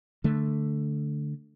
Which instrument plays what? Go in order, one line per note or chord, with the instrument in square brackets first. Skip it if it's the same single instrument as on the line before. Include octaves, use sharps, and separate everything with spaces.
[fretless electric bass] D3 A3